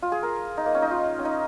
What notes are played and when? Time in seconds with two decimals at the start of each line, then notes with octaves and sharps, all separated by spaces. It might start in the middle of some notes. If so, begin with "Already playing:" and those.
0.02 F4
0.12 G#4
0.23 A#4
0.57 D#4
0.66 A#3
0.74 C#4
0.82 D#4
0.91 F4
1.19 C#4
1.25 D#4